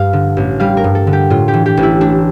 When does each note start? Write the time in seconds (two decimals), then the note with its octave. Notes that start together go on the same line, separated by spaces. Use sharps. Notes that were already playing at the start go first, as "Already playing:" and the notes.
Already playing: G2 F5
0.13 D3
0.37 A1
0.60 G3 F5
0.77 A#4
0.84 G2
0.95 A4
1.07 D3
1.13 G4
1.30 A2 F4
1.48 G4
1.54 E3
1.66 G4
1.77 A1
1.83 E4
2.01 A3 D4